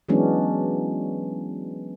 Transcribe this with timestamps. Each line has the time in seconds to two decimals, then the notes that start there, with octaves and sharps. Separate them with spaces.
0.09 E3 F#3 G#3 B3 C#4 D4